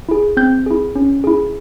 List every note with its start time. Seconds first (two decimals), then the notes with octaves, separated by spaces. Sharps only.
0.09 E4 G#4
0.37 C4 G6
0.66 E4 G#4
0.96 C#4
1.24 E4 G#4